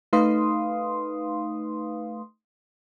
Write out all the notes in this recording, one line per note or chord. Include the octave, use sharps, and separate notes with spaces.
A3 D#4 B4 F5 C6 D#6